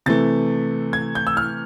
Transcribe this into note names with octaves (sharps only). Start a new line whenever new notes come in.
C3 E3 A3 A6
G#6
G6
E6
F6